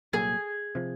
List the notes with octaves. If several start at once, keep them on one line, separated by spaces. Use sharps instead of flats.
C2 A#2 F#3 A#3 G#4
C3 F3